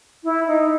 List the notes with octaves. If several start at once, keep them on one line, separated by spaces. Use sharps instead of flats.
E4
D#4